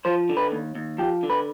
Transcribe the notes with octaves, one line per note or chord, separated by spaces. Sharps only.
F3 C5
D3
B4
D#2
D#2
F3 G4
D3
B4